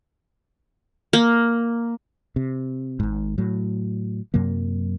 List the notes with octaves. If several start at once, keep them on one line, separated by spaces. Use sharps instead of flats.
A#3
C3
G#1 G#2
A2 F#3
F#2 C3 F#3 A#3